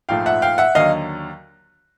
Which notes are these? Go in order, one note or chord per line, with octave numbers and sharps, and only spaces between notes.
A#1 G#2 F3 A3 F5 G5
E5 F#5
F5 G5
E5 F#5
D#2 D3 F#3 D#5 F5